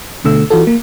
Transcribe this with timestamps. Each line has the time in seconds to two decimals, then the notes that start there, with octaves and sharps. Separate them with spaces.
0.24 B2 D3 A3 E6
0.50 E3 F4 F#4 A4
0.67 A#3